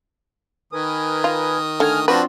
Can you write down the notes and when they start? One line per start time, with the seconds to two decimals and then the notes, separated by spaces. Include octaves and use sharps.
0.73 D#3 A#4 B4 G#5 D#6
1.24 F4
1.80 D3 A3 G#5 F6
2.08 F3 C4 D4 F4 F#4 B4